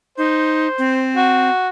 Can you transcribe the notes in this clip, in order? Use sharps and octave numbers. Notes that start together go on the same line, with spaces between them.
D#4 C5
C4
F#4